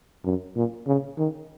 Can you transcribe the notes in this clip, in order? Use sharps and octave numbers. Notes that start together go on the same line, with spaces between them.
F#2
A#2
C#3
D#3